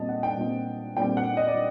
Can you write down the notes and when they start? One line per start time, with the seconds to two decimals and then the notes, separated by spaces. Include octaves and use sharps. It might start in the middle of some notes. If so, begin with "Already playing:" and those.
Already playing: A#2 G3 C4 D#5 A5
0.09 F#5
0.23 G5
0.37 A#2 G3 C4
0.97 A#2 G3 C4 G5
1.17 F#5
1.37 D#5
1.47 D5